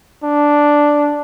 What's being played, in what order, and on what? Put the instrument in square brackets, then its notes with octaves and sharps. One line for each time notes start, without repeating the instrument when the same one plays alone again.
[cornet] D4